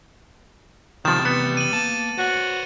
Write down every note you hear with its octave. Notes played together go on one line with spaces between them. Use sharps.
E2 C3 D#3 F3 G3 A6 E7
B3 C#7
D#7 F#7
A#3 A5
F#4 C5 C#5